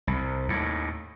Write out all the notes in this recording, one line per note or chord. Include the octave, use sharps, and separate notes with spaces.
C2
D#2 A2